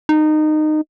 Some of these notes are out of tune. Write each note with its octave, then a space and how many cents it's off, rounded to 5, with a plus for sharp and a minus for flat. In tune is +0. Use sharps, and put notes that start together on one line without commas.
D#4 -20